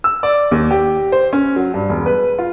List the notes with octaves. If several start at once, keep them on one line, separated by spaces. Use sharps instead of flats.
E6
D5
D#2
G4
C5
C#4
F#3
G2
E1
B4
F4